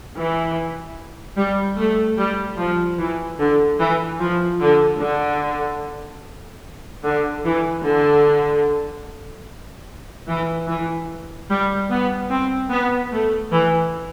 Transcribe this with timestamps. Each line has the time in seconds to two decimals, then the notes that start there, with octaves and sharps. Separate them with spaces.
0.16 E3
1.37 G3
1.78 A3
2.18 G3
2.59 F3
2.99 E3
3.40 D3
3.81 E3
4.21 F3
4.61 D3
5.02 D3
7.05 D3
7.45 E3
7.86 D3
10.28 E3
10.70 E3
11.51 G3
11.91 B3
12.32 C4
12.72 B3
13.13 A3
13.53 E3